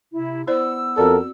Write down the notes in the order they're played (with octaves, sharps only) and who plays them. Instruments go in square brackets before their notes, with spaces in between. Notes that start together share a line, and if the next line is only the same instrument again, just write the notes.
[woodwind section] C3 E4
[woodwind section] B3 E6 [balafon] E4 C5 D5
[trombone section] F2 A4 A#4 [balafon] C4 F#4 D5